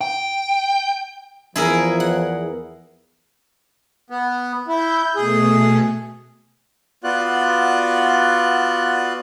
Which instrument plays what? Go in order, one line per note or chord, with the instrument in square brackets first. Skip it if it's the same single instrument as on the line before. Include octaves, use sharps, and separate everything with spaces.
[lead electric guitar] G5
[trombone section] E2 [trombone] F3 [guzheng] E4 G#4 A#4
[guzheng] F#5
[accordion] B3
[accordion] E4 [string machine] G6
[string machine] B2 A3 [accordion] G#4
[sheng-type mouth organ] B3 F4 F#4 D5 F#6